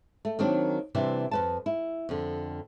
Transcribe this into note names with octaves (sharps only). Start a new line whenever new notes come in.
A3
D#3 F#3 A#3 C4 D4
C3 E3 G3 D4 C5
F2 B4 A5
E4
F2 D3